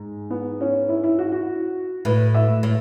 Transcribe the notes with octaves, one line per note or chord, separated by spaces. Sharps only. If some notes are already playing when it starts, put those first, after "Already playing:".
Already playing: G#2
B3
C#4
E4
E4
F#4
F#4
A2 B4
E5
A2